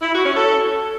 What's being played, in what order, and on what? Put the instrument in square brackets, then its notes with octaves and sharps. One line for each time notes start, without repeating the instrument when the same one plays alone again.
[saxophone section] E4
F#4
C#4
A4